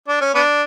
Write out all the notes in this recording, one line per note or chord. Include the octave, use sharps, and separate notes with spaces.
D4
C#4
B3 D4